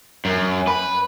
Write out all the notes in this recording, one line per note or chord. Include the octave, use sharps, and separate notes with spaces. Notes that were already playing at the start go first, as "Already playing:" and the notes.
F#2
B4